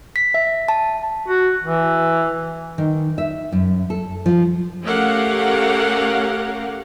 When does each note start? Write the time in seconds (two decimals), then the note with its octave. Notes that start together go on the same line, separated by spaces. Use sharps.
0.16 B6
0.34 E5
0.68 A5
1.28 F#4
1.63 E3
2.78 D#3
3.18 E5
3.52 F#2
3.90 A4
4.26 F3
4.83 A3 C#4 G4 A#4 F5 F#5